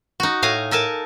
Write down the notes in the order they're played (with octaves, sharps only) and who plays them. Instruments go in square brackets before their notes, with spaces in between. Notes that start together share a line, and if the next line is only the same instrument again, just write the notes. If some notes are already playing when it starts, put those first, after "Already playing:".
[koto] D#4 F#4
A2 F5 G#5 A#5
A4 A#4 G#5 A5